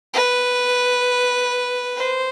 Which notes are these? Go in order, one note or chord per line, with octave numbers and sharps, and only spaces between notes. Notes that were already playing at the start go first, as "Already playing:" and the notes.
B4
C5